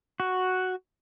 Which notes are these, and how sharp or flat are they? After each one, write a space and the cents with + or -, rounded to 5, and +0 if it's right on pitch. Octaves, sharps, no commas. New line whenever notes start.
F#4 +0